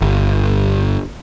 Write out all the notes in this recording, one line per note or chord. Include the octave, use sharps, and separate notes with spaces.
G1